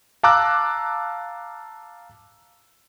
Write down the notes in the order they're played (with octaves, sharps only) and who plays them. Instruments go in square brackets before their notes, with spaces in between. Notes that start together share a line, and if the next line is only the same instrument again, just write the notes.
[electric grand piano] F5 A5 A#5 D6 E6 F#6